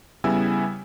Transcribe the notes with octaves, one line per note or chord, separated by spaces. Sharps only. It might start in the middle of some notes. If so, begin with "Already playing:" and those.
C#3 G3 B3 E4 G#5 E6